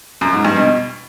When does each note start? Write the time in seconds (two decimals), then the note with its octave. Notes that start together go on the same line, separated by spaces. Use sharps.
0.21 F#2
0.33 G#2
0.45 G2
0.56 B2